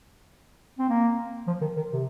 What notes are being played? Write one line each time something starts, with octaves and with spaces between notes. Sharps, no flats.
C4
A#3
F3
D#3
D#3
C3